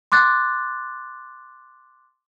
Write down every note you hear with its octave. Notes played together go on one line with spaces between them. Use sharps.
C6 D6 F#6 A6